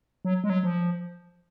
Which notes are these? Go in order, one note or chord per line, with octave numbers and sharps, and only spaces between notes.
F#3
G#3
F#3
F3